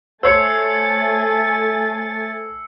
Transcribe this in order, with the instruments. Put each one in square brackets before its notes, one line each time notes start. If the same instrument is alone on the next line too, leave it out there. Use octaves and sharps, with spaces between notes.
[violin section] A3 G#5 A6 [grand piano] C5 C#5 [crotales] E6 C7 C#7